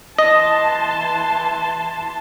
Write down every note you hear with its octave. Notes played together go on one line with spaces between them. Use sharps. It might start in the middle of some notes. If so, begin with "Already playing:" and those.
E3 D#5 A5 C6